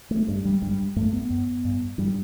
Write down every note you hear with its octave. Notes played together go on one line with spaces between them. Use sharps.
A3
G2
G3
G2 G3
G2 A3
B3
F#2
G2
G2 G3